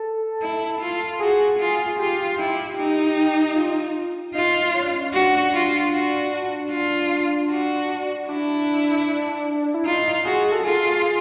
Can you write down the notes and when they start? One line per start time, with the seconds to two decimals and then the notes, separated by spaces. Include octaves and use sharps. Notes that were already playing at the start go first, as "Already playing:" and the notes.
Already playing: A4
0.42 E4
0.81 F4
1.20 F#4 G#4
1.59 F4
1.99 F4 G4
2.38 E4
2.77 D#4
3.56 F4
4.34 D#4 F4
4.74 C#4
4.82 D4
4.91 C#4
5.14 D4 F#4
5.53 F4
5.92 F#4
6.71 F4
7.50 F#4
8.28 D4 E4
9.74 E4
9.85 D#4 F4
10.25 F#4 G#4
10.52 A4
10.64 F4 G#4